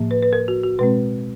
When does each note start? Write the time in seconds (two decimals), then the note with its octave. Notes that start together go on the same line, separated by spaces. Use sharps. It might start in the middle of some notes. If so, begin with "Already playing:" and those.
Already playing: A2 F3 A#3
0.11 B4
0.23 B4
0.33 A#4
0.48 F#4
0.64 F#4
0.79 B2 G#3 C4 B4